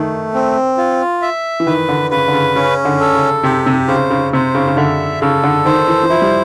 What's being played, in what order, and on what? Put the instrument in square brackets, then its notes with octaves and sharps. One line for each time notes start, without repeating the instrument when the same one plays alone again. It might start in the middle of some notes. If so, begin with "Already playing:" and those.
Already playing: [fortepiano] D#3 [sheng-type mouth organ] A3
[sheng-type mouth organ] C4
F4
E5
[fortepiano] E3
[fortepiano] D#3 [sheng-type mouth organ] B4
[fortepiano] D3
[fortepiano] C#3 [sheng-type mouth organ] B4
[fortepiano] D3
C#3
[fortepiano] C#3 [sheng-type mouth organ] C#4
[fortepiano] D3
[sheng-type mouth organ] A4
[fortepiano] C#3
[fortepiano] C3 [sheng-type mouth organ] G4
[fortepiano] C3
[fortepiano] C#3 [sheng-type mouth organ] C5
[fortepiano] C#3
[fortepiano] C3 [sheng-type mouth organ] C5
[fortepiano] C#3
C#3
[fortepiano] D3 [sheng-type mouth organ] E5
[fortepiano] C#3 [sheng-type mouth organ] A4
[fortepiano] D3
[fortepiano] D#3 [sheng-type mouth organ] C5
[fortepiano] E3
E3
[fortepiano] F3 [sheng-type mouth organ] E4
[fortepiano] G3